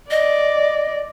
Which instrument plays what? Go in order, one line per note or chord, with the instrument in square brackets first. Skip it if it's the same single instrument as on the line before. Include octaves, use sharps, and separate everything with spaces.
[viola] D5 [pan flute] D#5